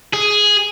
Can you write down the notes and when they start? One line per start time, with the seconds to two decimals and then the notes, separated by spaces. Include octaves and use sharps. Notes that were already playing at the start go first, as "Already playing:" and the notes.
0.13 G#4